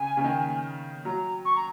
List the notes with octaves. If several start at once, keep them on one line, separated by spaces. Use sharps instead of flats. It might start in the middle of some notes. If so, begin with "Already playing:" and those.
Already playing: C#3 G#5
C#3
D#3
F#3 A#5
C#6
A#5